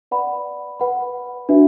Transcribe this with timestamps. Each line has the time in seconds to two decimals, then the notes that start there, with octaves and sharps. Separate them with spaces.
0.11 B4 D5 F#5 B5
0.80 B4 F#5 B5
1.49 D4 F#4 B4 E5